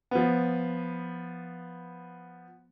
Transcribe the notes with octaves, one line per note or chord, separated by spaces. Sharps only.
F3 B3